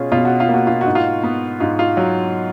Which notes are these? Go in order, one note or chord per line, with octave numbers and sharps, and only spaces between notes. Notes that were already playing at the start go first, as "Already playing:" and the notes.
Already playing: B2 C#4 F4 G#4
B2 F4
F#4
F4
A#3 F#4
F4
F#4
G#2
F4
B3
G#2 F4
F4
F#3